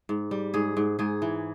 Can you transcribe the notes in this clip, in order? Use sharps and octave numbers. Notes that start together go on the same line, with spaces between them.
G#2
G3
G#2 G#4
G#2
G#2 G#4
E3